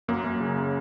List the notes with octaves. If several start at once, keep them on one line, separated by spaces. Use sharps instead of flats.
F#2 A#3
F#2
C#3